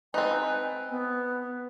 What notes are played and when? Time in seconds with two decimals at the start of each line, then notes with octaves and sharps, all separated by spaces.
0.14 C4 D#4 B4 G#5 A5
0.90 B3